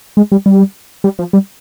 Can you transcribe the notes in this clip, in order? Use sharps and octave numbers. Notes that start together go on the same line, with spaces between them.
G#3
G3
G3
G3
F3
G3